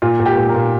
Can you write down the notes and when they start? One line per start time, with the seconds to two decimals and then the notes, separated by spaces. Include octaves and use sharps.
0.02 A#2 F4
0.20 A#2
0.26 G4
0.38 A#2
0.49 A#4
0.55 A#2